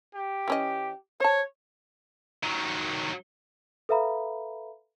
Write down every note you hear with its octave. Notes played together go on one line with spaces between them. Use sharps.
G4
E3 C#4 D#5
C5 C#5 A5
D#3 F#3
A4 B4 E5 F5 A#5 B5